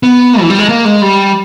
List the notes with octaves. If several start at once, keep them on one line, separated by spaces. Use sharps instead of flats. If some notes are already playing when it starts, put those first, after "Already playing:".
B3
E3
G3
G#3
A#3
G#3
G3